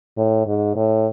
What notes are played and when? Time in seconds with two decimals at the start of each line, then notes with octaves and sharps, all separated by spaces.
0.17 A2
0.47 G#2
0.76 A2